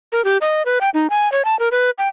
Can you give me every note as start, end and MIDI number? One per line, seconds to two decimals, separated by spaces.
0.12 0.24 70
0.25 0.37 67
0.41 0.63 75
0.66 0.79 71
0.81 0.89 79
0.94 1.10 63
1.10 1.31 80
1.32 1.45 73
1.45 1.58 81
1.59 1.68 70
1.72 1.90 71
1.98 2.08 79